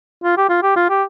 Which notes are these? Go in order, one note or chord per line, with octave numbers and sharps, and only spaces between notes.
F4
G4
F4
G4
F4
G4